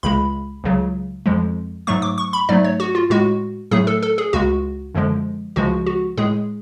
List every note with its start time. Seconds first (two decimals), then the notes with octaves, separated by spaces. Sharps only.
0.03 C#2 C#3 G#3 B5
0.64 C#2 C#3 F#3
1.26 F2 F3 G#3
1.87 G#2 F#3 A3 C#6
2.02 D6
2.18 C#6
2.33 B5
2.49 G#2 F#3 A3 D5
2.64 C#5
2.80 F#4
2.95 F4
3.10 A2 G#3 F#4
3.71 A2 F#3 A3 G#4
3.87 A4
4.03 A4
4.18 G#4
4.33 C#2 C#3 G#3 F#4
4.95 F#2 D3 F3 G#3
5.56 C#2 C#3 F3 G#3 F#4
5.86 F#4
6.17 A2 G#3 G#4